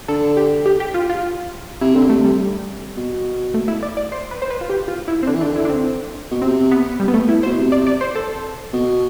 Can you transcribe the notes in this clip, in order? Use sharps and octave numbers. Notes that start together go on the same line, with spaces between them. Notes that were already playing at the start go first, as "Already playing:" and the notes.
D3 A4
G4
G4
G4
F4
F4
C3 E4
D3 C4
C3 A3
G3
B2
A3
E4
D5
D5
C5
B4
C5
B4
F4
G4
F4
E4
C4
D3 D4
E3
D4
D3
E4
D4
C4
B2
C3 C4
B3
G3
B3
A3
E4
B2 C5
C3
D5
D5
C5
A4
B2